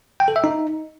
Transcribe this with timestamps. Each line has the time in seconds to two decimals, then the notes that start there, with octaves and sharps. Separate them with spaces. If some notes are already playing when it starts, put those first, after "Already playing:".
0.20 G5
0.28 A4
0.36 E5
0.44 D#4